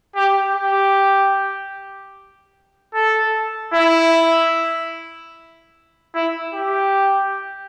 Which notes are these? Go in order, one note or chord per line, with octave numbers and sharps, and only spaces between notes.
G4
G4
A4
E4
E4
G4